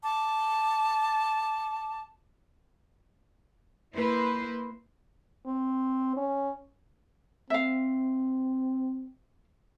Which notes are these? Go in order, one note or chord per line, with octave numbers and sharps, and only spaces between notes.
A5 D6
A#3 E4 B4 C5
C4
C#4
C4 E5 F5